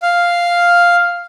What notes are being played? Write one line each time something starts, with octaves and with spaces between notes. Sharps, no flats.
F5